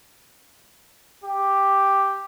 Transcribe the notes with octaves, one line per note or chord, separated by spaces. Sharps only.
G4